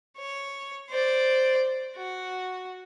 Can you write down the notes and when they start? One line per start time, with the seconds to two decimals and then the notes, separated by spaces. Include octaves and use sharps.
0.18 C#5
0.89 C5 D5
1.96 F#4